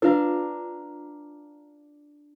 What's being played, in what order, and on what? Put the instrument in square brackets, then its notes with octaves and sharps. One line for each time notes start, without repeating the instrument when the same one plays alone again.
[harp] D4 F5 A#5 [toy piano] F4 B4